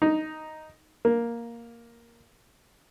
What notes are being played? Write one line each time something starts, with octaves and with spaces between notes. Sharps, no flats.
D#4
A#3